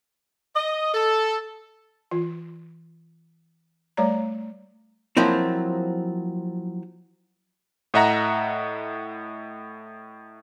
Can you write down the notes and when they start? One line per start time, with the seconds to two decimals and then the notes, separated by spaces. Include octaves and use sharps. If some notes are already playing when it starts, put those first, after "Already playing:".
0.56 D#5
0.94 A4
2.11 E3 F4
3.97 G3 A3 C#5 D5 A#5
5.17 F3 F#3 A#3 C4 E4
7.94 A2 D#5 E5 F#5 A#5 A#6